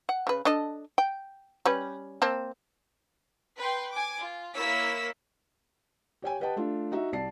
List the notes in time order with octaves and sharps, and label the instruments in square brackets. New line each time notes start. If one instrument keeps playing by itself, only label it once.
[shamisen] F#5
C#3 B4
D4 A4 D#5
G5
G3 C#4 B4
A#3 C4 A5
[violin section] B4 G5 C6
G#5 D6
F4
A#3 E4 C#5 E6 B6
[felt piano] G4 C#5 G5 G#5
G4 B4 D#5 F#5 G5 A5
A3 D4 F4
D#4 F#4 E5
C2 D5 A5 C7